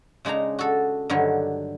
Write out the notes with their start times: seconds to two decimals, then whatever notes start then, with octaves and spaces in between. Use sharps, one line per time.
0.25 C#3 G#3 D4 D#4 A#5
0.59 F#4 A4
1.10 G2 D3 D#3 F#3